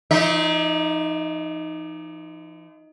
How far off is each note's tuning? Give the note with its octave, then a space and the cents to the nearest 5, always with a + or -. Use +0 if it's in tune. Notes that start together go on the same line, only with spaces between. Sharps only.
F3 -45 D#4 +0 E5 -45